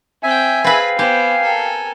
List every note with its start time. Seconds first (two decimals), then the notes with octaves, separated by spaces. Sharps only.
0.23 C4 E5 G5 G#5
0.64 C4 G#4 B4 F5 B5
0.99 B3 G4 C5 G#5
1.41 A4 A#4